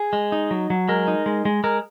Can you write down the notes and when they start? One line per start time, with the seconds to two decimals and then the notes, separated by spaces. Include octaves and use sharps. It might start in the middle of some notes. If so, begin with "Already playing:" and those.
Already playing: G#4
0.13 G#3
0.32 D#4
0.51 F#3
0.70 F#3
0.89 G#3 A#4
1.08 D#4
1.26 G#3
1.45 G#3
1.64 G#3 A#4